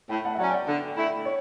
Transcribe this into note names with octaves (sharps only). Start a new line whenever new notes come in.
A2 G5 B5
F#5 A5
E5
F#3 C#4 D5 F#5
G5
D5 F#5
D3
A3 E4
C#5